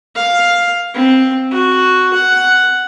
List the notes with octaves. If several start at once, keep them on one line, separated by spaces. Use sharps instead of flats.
F5
C4
F#4
F#5